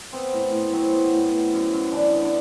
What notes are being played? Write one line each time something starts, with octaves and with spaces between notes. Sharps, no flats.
B3 C4 C5
A2
A2
F#3 C4 C5
B3
A2
B3
F#2
F#2
E3 D4 D5
B3
D4 D5